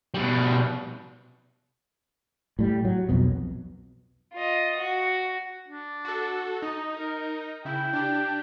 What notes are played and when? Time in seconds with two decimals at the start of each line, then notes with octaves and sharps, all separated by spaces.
0.14 B2 G3
2.59 A2 G3
2.85 F#3
3.09 B1 F2 B2
4.34 F4 D#5
4.78 F#4
5.68 D4
6.05 F#4 A4
6.62 D#4 D#5
6.98 A#4
7.65 C#3 E4 G5
7.93 D4 G4